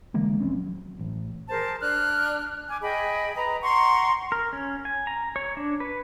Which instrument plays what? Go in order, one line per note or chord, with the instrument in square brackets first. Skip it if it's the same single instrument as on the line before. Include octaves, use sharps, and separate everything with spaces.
[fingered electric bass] D3 E3 G#3 A#3
D#1 A#1 C4 C#4
F#3
A1
[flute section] G#4 A#4 C5 A5
D4 F6 F#6
G#5 D6
G#4 D#5 G5 B5
B4 D#5 A#5
F#5 A#5 C6 C#6
[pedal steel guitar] A#4
C#4
G#5
A#5
C#5
D4
B4